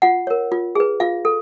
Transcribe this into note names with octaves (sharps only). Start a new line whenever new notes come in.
F4 F#5
A#4 C#5
F4
G#4 B4
F4 F5
A4